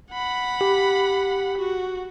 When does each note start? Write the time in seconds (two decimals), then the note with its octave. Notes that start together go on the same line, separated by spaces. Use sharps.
0.11 F#5 B5
0.61 G4
1.58 F#4